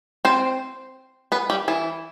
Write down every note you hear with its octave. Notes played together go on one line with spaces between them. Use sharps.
C4 C5
B3 B4
G3 G4
E3 E4